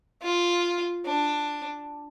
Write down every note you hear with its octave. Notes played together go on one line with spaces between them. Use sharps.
F4
D4